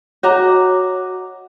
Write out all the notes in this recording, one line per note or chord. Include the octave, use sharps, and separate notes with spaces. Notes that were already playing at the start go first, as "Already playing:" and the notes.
F#4 C#5 D#5 A#5 D6